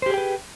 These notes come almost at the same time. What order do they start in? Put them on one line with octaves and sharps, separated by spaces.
C5 G4 G#4 G5 B4